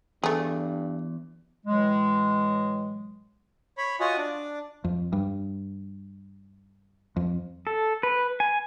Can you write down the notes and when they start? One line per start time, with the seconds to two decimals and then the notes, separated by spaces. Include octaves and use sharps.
0.24 E2 G2 A3 G#4
1.66 A2 E3 F#3 G#3
3.78 C#5 B5
4.00 F4 F#4 C#5 D#5 F#5 G#5
4.17 D4 D5
4.84 F2
5.13 G2
7.16 F2
7.67 A4
8.03 B4
8.40 G#5